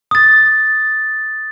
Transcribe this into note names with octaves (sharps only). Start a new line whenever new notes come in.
D#6 A6